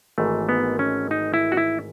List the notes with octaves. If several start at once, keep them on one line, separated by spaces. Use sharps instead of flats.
G#1 G#2 E3 A3
B3
C#4
D#4
E4
F#4
E4